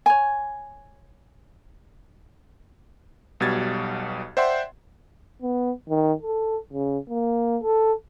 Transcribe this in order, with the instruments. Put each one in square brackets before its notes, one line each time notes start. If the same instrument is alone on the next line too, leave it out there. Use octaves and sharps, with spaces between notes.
[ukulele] C#5 G#5
[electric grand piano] B1 B2 G3 G#6 A6
C5 D5 E5 F#5 G5 C6
[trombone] B3
D#3
A4
C#3
A#3
A4